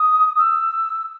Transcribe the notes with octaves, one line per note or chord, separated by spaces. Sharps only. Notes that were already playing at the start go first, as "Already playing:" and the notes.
Already playing: D#6
E6